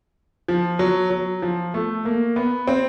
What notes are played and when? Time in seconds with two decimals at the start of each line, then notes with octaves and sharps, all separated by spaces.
0.48 F3
0.79 F#3
1.10 F#3
1.42 F3
1.74 A3
2.05 A#3
2.36 B3
2.67 C4